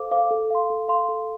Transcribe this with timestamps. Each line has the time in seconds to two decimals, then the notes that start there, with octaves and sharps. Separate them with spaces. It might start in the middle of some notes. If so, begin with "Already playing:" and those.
Already playing: A4 C5 F5 D6
0.11 C5 F5 D6
0.31 A4
0.50 F5 C6
0.70 A4
0.88 F5 C6
1.08 A4